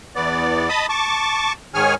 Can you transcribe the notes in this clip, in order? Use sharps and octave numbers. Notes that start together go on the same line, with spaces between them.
E2 B3 D5
D#5 A5 B5 D#6
A5 C#6 D6
G#2 D#3 G#4 C#5 G#5 F6